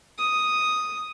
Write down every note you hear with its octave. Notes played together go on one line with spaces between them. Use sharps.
D#6